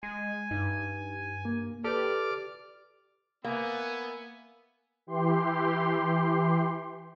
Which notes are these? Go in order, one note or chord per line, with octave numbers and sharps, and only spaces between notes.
G#3 G#5
G2 D#4
A#3
G4 A4 B4 D5 D6 F6
A#3 B3 E5 G#5
E3 G4 C6